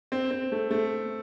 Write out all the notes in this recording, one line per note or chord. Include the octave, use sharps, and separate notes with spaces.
C4
C4
A3
A3